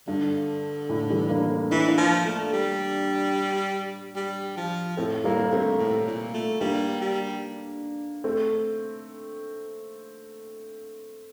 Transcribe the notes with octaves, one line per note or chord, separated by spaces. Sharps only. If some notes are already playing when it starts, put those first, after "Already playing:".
G2 D3
A2
E3 G3
A#3 D4
D4
A3 C4
E3 D4
A#3 D4
F3
A3
G3
G3
F3
A2 A3 C4
A2 G3 A#3
A#3
G2 A3 C4
A2
A#2
A3
G3 A#3 D4
G3
A3 C4